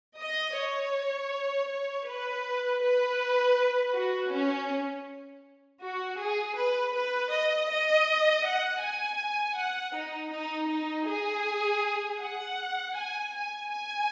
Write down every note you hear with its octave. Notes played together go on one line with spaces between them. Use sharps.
D#5
C#5
C#5
B4
B4
F#4
C#4
F#4
G#4
B4
B4
D#5
D#5
F#5
G#5
F#5
D#4
D#4
D#4
G#4
F#5
G#5
G#5
G#5